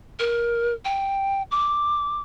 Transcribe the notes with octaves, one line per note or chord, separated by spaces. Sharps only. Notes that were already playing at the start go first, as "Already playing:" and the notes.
A#4
G5
D6